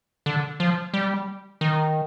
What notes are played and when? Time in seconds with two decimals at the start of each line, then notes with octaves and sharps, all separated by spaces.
0.26 D3
0.60 F3
0.94 G3
1.61 D#3